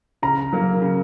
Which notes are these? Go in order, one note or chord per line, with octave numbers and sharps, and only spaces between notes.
C#3 A#5
F#3 A#3
C#3